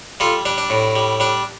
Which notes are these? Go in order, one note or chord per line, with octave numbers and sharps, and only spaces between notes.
G3 F4 A4
G3 D4
D4
A2
G3
G3 D4